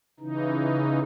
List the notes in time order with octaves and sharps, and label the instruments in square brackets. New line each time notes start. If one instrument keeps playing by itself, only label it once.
[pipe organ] C#3 E3 D#4